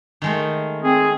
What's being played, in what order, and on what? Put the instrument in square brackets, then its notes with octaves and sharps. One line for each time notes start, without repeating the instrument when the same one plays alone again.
[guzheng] D#3 G#3 A3
[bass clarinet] C4 [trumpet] G#4